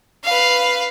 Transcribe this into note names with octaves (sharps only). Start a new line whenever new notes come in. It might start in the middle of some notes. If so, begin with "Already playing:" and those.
B4 F5